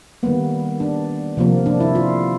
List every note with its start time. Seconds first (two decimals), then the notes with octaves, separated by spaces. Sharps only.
0.23 D#3 G3 A#3 B3
0.80 D4
1.37 C3 F3 A#3
1.66 D4
1.80 E4
1.95 F4